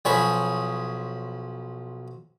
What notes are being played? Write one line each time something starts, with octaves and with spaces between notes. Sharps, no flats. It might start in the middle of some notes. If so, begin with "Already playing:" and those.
B1 F3 G#4 C#5 B5